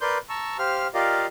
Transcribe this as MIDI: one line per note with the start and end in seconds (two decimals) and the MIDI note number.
0.01 0.18 70
0.01 0.18 71
0.01 0.18 74
0.01 0.18 84
0.01 0.18 91
0.29 0.57 81
0.29 0.57 82
0.29 0.57 85
0.29 0.57 88
0.59 0.87 67
0.59 0.87 72
0.59 0.87 77
0.59 0.87 89
0.94 1.26 65
0.94 1.26 67
0.94 1.26 70
0.94 1.26 74
0.94 1.26 75
0.94 1.26 77